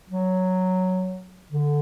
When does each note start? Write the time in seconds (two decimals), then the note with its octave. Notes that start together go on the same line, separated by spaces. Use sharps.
0.09 F#3
1.52 D3